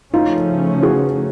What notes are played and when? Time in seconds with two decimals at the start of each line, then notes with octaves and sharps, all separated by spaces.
0.13 C#3 F3 A3 C#4 D#4 F4
0.83 F#4 G#4